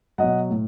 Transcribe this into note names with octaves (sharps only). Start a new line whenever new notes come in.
B2 F#3 D#5 F#5
A2